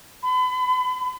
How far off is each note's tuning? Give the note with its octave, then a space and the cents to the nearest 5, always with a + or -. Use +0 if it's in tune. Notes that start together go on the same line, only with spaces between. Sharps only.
B5 +40